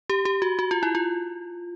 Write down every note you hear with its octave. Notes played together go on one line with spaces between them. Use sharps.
G4
G4
F#4
F#4
F4
E4
F4